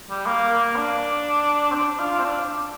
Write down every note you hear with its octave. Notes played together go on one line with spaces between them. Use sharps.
G3
A#3
A#3
D4
C4
D4
F4
C4
D4